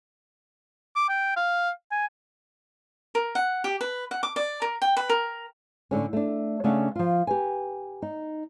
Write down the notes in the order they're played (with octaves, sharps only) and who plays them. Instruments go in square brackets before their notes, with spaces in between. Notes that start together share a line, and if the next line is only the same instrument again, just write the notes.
[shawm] D6
G5
F5
G#5
[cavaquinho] A#4
F#5
G4
B4
F#5
D6
D5
A#4
G5
B4
A#4
[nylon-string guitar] A2 D3 C#4
A3 D4
C#3 A3 C#4 D4 F#5 A5
F3 F4
G4 B4 G#5
D#4